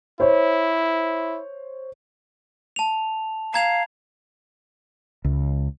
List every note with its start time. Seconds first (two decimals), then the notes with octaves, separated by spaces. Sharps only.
0.20 E4 C5 C#5
2.76 A5 F7
3.54 F5 A#5 G#6 F7
5.25 C#2